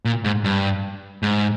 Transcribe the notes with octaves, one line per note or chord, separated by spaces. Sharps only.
A#2
G#2
G2
G#2